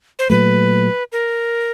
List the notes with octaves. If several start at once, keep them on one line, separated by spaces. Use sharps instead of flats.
C5
A#2 F#3 A3 B4
A#4